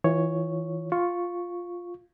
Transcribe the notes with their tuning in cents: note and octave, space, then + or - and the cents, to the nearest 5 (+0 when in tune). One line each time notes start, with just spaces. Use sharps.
E3 -20 F4 +0 C#5 +0
F4 +5 C#6 +0